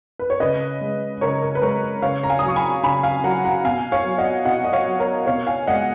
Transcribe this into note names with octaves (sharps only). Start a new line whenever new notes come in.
B4
C#5
C#3 B4 D#5
G#3
C#3 A#4 C#5
A#4
B4
G#3 A#4 C#5
C#3 C#5 F5
A#5
F5 G#5
D#6
F#3
C#6
G#5 B5
C#3 G#5 B5
F5 G#5
F#3 F#5 A#5
F#5 A#5
B2 F5 G#5
C#5 F5
F#3
D#5 F#5
B2 D#5 F#5
D#5
C#5 F5
F#3
A#4 C#5
B2 C#5 F5
F5 G#5
G#3 D#5 F#5